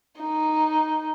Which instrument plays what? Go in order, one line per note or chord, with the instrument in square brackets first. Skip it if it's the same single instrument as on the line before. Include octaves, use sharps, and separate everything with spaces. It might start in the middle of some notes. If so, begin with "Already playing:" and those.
[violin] D#4